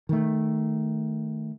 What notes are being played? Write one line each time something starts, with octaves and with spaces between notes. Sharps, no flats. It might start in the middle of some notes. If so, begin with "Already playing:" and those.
D#3 A3